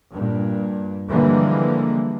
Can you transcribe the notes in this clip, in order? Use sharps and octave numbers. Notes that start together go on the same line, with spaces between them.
G2 A#2
D3 E3 F3 G3 G#3 A#3